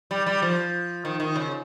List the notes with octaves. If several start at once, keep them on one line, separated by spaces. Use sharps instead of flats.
G3
G3
F3
D#3
D#3
C#3